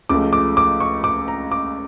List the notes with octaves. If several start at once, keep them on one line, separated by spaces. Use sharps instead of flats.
C#2 C#3 F3 A3 D6
D6
D6
C#6
D6
A#5
D6